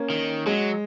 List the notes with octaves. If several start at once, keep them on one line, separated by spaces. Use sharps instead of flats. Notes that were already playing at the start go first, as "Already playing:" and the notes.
Already playing: A#3 C#4
D#3
F#3 G#3